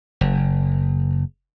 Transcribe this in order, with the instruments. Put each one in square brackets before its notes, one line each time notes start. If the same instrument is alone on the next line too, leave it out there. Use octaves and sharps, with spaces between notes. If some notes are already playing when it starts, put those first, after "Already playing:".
[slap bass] F#1